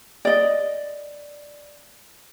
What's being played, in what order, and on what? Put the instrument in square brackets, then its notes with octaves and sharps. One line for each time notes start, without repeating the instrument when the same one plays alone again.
[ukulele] D5 D#5